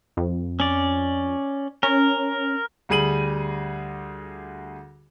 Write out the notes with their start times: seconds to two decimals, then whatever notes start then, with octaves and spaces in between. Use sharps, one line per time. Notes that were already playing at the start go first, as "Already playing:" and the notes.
0.17 F2
0.60 C#4 D5
1.83 C#4 A#4
2.89 D2 G3 G#4 D#7 F#7